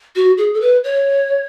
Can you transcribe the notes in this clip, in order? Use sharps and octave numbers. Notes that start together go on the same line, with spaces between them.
F#4
G#4
A4
B4
C#5